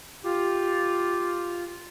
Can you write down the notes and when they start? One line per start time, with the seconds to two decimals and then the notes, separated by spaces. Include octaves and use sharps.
0.24 F4 G4